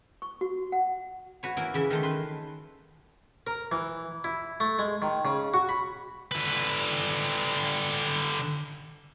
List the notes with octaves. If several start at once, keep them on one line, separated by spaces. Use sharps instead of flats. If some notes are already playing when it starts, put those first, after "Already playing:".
C#6
F#4
F#5
F#4 B4 C#5
E3 A#3 E4
C#3 E3 E5
D#3 A3 C6
B4 C6
A#4
E3
E4
A3
G#3
D#3
C#3
F#4
B5
D3 B4